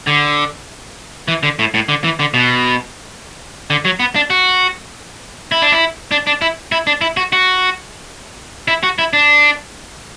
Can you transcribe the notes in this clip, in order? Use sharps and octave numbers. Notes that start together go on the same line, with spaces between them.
D3
E3
D3
A2
A2
D3
E3
D3
B2
D3
F#3
B3
D4
F#4
E4
D4
E4
D4
D4
E4
E4
D4
E4
F#4
F#4
E4
F#4
E4
D4